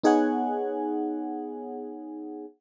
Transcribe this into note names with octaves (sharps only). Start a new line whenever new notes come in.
B3 D#4 G#4 C#5 F#5 G#5